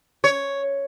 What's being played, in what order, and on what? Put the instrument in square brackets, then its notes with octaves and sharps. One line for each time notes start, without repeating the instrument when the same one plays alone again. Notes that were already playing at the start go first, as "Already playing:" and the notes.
[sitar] C#5